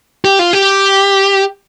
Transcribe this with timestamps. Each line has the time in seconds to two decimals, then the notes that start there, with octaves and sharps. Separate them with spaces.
0.25 G4
0.39 F4
0.53 G4